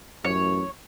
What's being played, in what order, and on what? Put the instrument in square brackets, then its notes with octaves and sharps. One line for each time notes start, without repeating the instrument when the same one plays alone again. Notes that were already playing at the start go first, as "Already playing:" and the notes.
[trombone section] A1 F#2 [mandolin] C#5